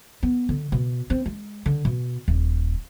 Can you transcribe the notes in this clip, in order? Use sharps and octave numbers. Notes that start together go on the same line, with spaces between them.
B3
D3
B2
C4
G#3
D3
B2
D#1